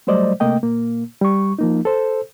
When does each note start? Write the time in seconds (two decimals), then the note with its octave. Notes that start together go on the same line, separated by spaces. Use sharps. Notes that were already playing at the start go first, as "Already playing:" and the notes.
0.07 F#3 G3 A3 C5 D5 D#5
0.40 C3 A3 A#3 D#5 G5
0.63 A#2 A#3
1.21 G3 C#6
1.59 F3 A#3 D#4
1.85 A4 C5